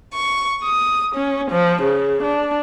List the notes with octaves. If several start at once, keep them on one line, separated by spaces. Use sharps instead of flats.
C#6
D#6
C#4
F3
C#3
D4